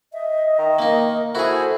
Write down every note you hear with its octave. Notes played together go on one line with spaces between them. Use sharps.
D#5 E5
D#3
A#3 D#4 A#4
E4 F#4 G#4 A4 C5